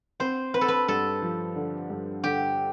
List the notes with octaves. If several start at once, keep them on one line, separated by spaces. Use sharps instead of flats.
C4 C5
C4 B4
A4
B4
G2 A4
F3
D3
G2
D3 G4